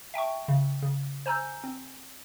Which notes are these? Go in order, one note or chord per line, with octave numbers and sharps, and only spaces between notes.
E5 G5 A5 C#6
C#3
C#3
C5 G#5 A#5 E6 G6
C4